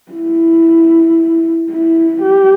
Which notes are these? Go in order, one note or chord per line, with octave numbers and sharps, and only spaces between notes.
E4
E4
G4